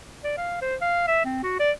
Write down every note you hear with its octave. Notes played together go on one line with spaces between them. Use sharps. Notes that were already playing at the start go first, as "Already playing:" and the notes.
D5
F5
C5
F5
E5
C4
F#4
D5